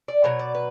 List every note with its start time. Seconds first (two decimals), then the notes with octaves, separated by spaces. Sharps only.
0.08 D5
0.24 B2 F#3 C#5
0.39 D5
0.55 B4